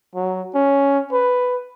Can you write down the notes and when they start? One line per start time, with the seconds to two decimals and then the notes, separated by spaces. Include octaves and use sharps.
0.15 F#3
0.55 C#4
1.12 B4